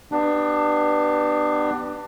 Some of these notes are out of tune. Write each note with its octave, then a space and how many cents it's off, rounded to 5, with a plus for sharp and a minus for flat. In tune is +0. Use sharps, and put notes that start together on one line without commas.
B3 +0 D4 +25 G4 -15